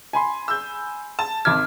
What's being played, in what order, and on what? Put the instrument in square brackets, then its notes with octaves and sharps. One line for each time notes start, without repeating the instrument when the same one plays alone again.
[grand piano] G#5 B5 C6
[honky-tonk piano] E6 G6
A5
[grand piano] G#1 D6 G#6 [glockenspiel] F6